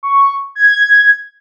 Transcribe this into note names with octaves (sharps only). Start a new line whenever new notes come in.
C#6
G#6